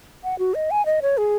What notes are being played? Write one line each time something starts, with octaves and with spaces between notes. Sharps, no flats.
F#5
F#4
D#5
G#5
D#5
C#5
G#4